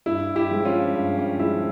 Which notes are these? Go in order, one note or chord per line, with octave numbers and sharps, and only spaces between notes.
G2 E4
E4 G4
F3 G#3
C#4 F4
G2
C#4
F3 G#3 E4